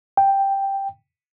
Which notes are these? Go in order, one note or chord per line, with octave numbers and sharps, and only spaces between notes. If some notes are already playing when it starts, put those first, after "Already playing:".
G5